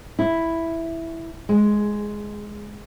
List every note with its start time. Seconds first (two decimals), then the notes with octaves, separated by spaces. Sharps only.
0.19 E4
1.49 G#3